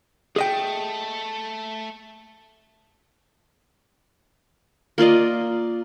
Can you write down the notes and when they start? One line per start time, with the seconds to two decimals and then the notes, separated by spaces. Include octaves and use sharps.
0.36 A3 G#4 D#5 G5
4.98 A#3 F4 D5 D#5